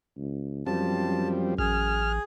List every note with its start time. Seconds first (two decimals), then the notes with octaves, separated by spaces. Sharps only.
0.17 C#2
0.66 F#2 F3 G3 C4 A5
1.59 A1 G#4 F6